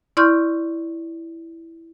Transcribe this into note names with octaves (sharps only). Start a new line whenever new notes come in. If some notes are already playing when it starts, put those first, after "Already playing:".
E4 D5 C6 C#6 F6 G6